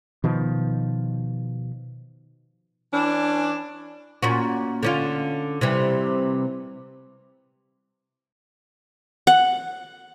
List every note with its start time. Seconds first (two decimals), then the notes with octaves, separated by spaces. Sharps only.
0.24 B2 D#3 F3
2.94 E3 C#4 D4
4.23 A#2 C#4 F#4
4.83 D3 C#4 F4
5.61 C3 E3 G3
9.27 F#5